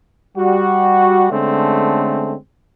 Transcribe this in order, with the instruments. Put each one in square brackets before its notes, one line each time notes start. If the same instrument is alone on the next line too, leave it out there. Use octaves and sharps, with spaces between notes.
[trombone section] G3 F#4
D3 G#3 A3 C4 C#4